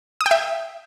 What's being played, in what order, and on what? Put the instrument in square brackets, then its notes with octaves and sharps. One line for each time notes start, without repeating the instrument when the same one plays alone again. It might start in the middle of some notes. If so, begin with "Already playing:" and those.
[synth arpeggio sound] D#6
G5
E5